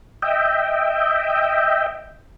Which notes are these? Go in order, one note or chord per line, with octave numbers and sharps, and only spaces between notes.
D#5 E5 G5